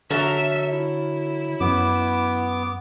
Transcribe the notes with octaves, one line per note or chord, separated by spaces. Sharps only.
D3 F#3 A4 A#4 E5
E4
F#2 B3 D6